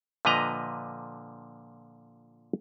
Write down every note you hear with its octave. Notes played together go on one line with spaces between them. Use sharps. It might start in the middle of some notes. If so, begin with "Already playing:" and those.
A#2 D3 F3 B4 D#5 A#5